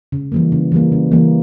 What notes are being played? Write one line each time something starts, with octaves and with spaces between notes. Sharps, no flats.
C#3
E3 G3 A#3
C#3
E3 G3 A#3
C#3
E3 G3 A#3